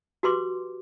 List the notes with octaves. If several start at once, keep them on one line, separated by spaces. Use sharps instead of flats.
F#4 G4 B4 C6 D6